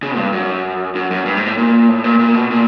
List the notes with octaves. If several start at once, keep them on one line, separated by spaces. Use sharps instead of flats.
C#3
G2
F#2
F#2
F#2
G2
G#2
A2
A#2
A2
A#2
A#2
B2
A#2